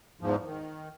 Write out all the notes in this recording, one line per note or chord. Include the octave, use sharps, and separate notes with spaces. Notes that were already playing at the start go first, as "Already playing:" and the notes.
E2 G#2 F3
D#3